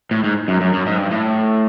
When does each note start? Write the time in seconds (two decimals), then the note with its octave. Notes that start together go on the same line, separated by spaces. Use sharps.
0.11 A2
0.24 G#2
0.48 F#2
0.61 F#2
0.73 F#2
0.86 G#2
0.98 G2
1.11 A2